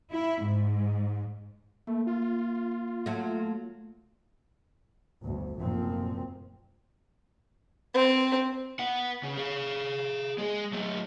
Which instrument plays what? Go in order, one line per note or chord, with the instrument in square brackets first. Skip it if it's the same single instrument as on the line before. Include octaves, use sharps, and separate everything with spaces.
[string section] E4
G#2
[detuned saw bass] A3 [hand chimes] A#3
[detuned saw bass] F4
[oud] F#3 A3
[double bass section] G1 D2
F1 F#2 A#2 F3 C4
[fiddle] C4
[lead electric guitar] B4 F#5
C#3
G#4 F5
G#3 G#4
F#3 A3